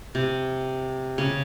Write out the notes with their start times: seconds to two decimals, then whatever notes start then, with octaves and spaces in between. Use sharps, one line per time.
0.15 C3
1.18 C#3